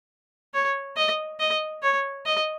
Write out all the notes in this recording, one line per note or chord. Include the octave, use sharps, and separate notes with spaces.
C#5
D#5
D#5
C#5
D#5